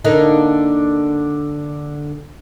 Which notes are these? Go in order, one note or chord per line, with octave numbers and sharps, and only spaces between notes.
D3 A#3 D#4